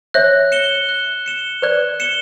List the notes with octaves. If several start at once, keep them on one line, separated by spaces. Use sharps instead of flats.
C#5 E5 F#6
C#7 E7 G7
F#6
C#7 E7 G7
B4 D5 F#6
C#7 E7 G7